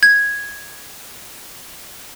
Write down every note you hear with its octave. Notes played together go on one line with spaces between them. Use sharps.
G#6